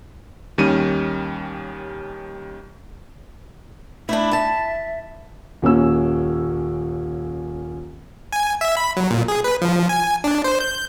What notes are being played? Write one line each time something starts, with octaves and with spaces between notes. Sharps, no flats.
D#2 D#3 G3 C#4 D#7
A3 D4 E4
E5 A5
D#1 A#3 C#4 E6
G#5
E5
B5
F#3
A#2
G#4
B4
F3
G#5
D4
C5
G6